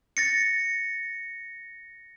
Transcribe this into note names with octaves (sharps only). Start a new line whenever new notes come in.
A6 A#6 C#7